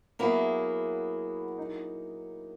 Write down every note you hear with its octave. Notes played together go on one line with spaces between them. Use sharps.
F#3 A#3 B3 E4 G#4
D#4